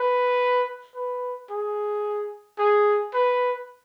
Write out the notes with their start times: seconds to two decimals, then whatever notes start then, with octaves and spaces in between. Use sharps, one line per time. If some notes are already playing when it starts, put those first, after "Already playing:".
Already playing: B4
0.96 B4
1.50 G#4
2.59 G#4
3.14 B4